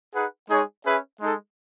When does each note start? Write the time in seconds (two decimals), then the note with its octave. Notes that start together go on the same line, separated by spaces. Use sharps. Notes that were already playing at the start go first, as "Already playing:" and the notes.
0.14 D#4 G#4 B4 F#5
0.49 G#3 D#4 G#4 C#5
0.85 C#4 G#4 B4 E5
1.20 G#3 D#4 A4